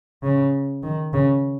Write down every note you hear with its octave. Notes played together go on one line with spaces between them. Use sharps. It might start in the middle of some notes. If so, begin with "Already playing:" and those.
C#3
D#3
C#3